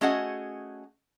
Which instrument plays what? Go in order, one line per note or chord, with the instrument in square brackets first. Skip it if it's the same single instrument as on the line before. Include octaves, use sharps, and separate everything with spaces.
[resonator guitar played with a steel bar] A3 C#4 F#4 G#4 D#5 F#5